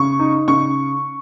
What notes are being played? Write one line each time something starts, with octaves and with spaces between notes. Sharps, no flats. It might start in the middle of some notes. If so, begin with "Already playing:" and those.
Already playing: C#3 C#6
D#4
C#3 C#6